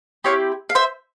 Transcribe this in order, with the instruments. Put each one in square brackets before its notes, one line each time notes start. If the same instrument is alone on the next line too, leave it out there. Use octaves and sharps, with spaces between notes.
[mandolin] C4 E4 G4 C#5 F5
F5
C5 E5